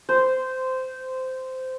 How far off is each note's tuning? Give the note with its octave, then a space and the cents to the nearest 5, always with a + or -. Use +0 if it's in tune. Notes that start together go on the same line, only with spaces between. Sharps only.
C5 -15